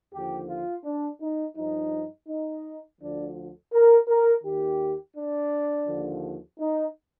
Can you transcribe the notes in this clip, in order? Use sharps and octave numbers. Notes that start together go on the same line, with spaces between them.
D#2 D3 F3 G4
F4
D4
D#4
G2 F3 D#4
D#4
D2 D3 F3 D4
A#4
A#4
D#2 D#3 G4
D4
D#2 D3 F3
D#4